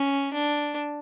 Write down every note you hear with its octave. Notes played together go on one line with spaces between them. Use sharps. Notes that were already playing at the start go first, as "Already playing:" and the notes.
Already playing: C#4
D4